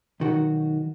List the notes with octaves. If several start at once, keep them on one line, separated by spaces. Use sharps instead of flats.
B1 D#3 F#4